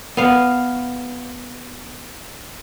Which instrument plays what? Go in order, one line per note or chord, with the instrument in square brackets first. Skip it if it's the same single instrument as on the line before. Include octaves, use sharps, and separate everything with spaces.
[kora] B3 F5